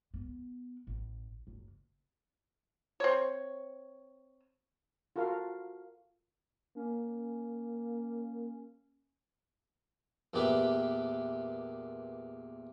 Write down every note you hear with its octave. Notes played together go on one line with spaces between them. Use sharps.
B3
A1
F#1
C4 C#5
F4 F#4 A4 A#4 F5
A#3 C#4
E2 A#2 D4 G4 B4 E5